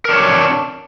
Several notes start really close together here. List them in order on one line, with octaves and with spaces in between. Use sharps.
A#4 D4 C#5